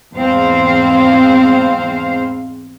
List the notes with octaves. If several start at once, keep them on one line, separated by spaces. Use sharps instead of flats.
E2 G#2 G#3 C4 C5 F5